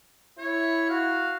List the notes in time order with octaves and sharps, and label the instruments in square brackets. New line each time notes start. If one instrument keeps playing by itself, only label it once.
[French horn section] E4 [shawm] C#5
[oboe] F#4 [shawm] F5